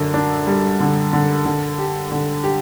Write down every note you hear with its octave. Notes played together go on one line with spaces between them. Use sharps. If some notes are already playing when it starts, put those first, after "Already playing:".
Already playing: F#2 D3 D4
D4
G3
D3
D3
D3
G4
D3
G4